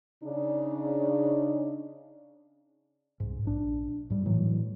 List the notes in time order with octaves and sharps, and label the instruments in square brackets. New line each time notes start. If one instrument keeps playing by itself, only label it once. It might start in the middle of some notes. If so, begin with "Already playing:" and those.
[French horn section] C#3 D4 D#4
[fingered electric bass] C2 G#2
A#1 D4
G#2 G3
A2 E3 F#3